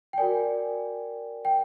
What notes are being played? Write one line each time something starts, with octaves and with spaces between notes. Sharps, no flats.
G5
F#4 A#4 D5 G#5
G5